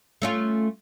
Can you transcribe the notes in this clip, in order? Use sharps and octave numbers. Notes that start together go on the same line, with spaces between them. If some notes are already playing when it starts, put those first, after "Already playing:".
A3 C#4 F4